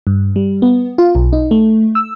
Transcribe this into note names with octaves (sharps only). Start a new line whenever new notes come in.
G2
G3
B3
F4
B1
D#4
A3
E6